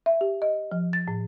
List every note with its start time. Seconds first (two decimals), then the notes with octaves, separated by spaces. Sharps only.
0.06 E5
0.21 G4
0.42 D#5
0.72 F3
0.93 A6
1.08 A2